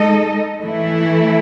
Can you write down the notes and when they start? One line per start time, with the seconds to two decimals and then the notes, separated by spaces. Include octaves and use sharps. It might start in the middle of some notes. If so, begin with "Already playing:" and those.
Already playing: G#3 D#4 A4 D#5
0.62 E3 A3 E4